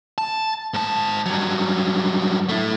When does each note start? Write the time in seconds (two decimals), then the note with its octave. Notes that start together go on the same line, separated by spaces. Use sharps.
0.18 A5
0.74 G#2 A5
1.26 G2 F#3
2.49 A3 E4